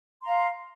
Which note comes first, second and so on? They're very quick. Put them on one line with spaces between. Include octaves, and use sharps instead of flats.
C6 A#5 F5